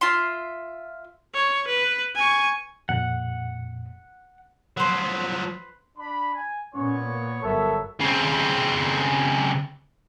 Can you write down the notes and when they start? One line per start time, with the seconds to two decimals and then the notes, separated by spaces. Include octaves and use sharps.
0.01 F4 E5 C6
1.34 C#5
1.68 B4
2.15 G#5 C#6
2.89 F2 A#2 F#5
4.77 F3 F#3 B4 C5
5.97 D4 B5
6.34 G#5
6.75 A#2 B3 C#4 C#5 C#6
7.05 A#3
7.43 G1 F#3 B3 A4 A#4 C#5 E5
8.00 C#3 C4